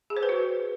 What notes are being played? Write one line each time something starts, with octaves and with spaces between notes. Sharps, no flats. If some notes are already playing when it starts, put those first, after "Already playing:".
G#4
C5
B4
F#4